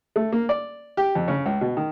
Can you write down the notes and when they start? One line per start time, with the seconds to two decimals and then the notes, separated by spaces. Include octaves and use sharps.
0.16 A3
0.32 A#3
0.49 D5
0.97 G4
1.15 F2
1.28 C#3
1.46 C#2
1.61 B2
1.77 D#3